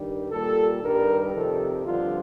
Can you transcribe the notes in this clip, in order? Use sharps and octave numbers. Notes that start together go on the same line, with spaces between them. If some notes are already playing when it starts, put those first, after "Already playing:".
Already playing: G2 D#3 G3
A#2 G3 A4
G2 D#3 G3 A#4
F2 C3 D#3 A4
G2 D3 F3 F4